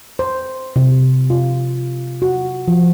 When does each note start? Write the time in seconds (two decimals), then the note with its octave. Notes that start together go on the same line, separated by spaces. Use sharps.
0.19 C5
0.76 C3
1.30 F4
2.22 F#4
2.68 F3